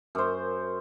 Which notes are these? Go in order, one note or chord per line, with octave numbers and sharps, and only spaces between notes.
F#2 C5